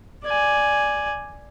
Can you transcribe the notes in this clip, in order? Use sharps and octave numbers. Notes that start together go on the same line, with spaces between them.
D5 G#5